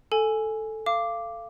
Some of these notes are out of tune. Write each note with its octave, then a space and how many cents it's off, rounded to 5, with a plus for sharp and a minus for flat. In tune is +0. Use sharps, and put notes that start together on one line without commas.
A4 +0 G#5 +5
F5 -25 D6 +0